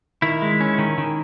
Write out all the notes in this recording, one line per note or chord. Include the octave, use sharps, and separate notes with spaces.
D#3 E4
G#3
C#4
D#3
D#3